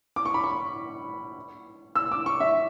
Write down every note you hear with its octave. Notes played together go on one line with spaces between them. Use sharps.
D6
C#6
B5
C#6
E6
D6
C#6
E5